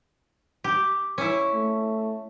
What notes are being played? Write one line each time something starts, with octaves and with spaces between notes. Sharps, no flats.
G4
C#4 E4
A3